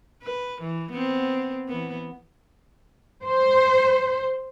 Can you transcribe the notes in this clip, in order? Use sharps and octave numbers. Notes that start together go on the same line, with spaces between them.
B4
E3
B3 C4
E3 B3
C5